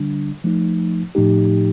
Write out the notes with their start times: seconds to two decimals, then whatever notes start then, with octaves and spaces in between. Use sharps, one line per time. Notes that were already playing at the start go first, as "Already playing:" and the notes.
Already playing: D3 G3 D4
0.44 F3 A3 D#4
1.15 A2 F3 A3 D#4 G4